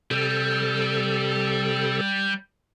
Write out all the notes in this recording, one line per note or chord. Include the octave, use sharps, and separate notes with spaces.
C3 G3 A4